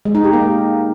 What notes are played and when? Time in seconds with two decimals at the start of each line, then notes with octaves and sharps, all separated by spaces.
0.05 G#3
0.15 D#4
0.24 G4
0.33 A#3